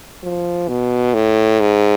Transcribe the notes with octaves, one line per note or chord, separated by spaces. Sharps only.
F3
B2
A2
G#2